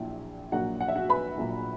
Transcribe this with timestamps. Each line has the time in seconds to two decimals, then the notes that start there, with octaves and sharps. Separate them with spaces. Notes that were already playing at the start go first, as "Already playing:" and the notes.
Already playing: A#1 A#2 F#3 A#3 E4
0.52 A#1 A#2 F#3 A#3 F#4 F#5
0.80 F#5
0.88 E5
0.96 F#4 F#5
1.09 B4 B5
1.38 A#1 A#2 F#3 A#3